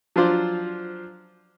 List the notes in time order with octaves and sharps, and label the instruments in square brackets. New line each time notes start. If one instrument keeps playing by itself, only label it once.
[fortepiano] F3 F#3 D4 F4 C5 D5